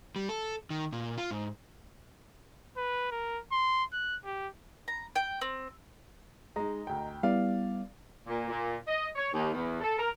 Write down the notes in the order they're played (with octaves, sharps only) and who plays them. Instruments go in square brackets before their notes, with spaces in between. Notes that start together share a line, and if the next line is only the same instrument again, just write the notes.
[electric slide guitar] G3
A4
D#3
A#2
F4
G#2
[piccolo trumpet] B4
A#4
C6
F#6
G4
[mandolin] A#5
G5
C4
[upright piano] G#3 D#4 [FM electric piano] D#5 A#5
[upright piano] D2 G5
[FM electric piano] G3 B3 E4 [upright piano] D5 F5
[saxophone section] A#2
A#2
D#5
C#5
D#2
E2
A4
A#4